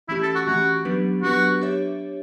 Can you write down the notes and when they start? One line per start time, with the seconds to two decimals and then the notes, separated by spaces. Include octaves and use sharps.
0.08 E3 A3 C#4 E4 G4
0.22 A4
0.35 F#4
0.46 E3 A3 C#4 F#4 G4
0.85 F#3 B3 D4 G4 B4
1.23 F#3 B3 D4 F#4 G4 B4
1.61 D4 G4 C#5 E5